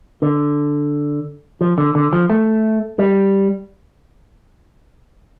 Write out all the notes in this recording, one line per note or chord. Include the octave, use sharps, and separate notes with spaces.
D3
F3
D3
D3
F3
A3
G3